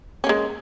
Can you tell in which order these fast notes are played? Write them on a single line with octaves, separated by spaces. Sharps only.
C#4 A#3 G#3